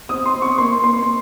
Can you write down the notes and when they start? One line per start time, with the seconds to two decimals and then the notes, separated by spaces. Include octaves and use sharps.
0.09 C4 D#6
0.26 C6
0.34 C4
0.42 C#6
0.58 A#3 C6
0.83 A#3 C6